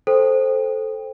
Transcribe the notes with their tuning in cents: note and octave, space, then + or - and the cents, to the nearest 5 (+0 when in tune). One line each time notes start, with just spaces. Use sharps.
A4 -5 C5 +0 G5 +15